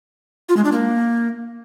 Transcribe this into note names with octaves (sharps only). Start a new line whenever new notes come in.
F4
G#3
D4
A#3